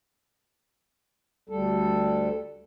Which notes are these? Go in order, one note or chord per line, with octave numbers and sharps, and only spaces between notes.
D2 G3 A4